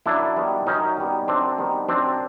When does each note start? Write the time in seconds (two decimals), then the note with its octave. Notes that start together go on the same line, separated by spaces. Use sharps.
0.06 F#2 D4 E4
0.36 D#3 G3 B3
0.67 F#2 C#4 D#4
0.97 D#3 G3 B3
1.28 F#2 C4 D4
1.58 D#3 G3 B3
1.89 F#2 C4 D4